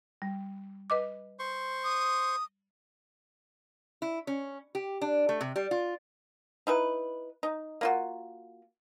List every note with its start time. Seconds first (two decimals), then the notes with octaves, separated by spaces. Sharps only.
0.22 G3
0.90 B4 D#5 D6
1.39 C5 C6 C#6
1.84 D#6
4.02 E4
4.27 C#4
4.75 G4
5.01 D4
5.29 A3
5.41 C3
5.56 G3
5.71 F4
6.67 D#4 E4 B4
7.43 D#4
7.81 A#3 F4 F#4